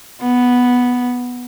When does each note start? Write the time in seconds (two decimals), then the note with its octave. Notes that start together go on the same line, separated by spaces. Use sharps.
0.22 B3